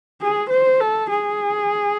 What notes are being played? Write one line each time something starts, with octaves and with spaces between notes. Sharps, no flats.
G#4
C5
A4
G#4